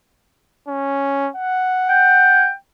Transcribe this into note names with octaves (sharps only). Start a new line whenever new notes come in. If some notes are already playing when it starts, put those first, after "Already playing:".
C#4
F#5
G5